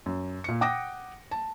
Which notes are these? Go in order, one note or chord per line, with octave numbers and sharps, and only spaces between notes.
F#2
A#2 C#7
F#5 G5 D6 D#6 A#6
A5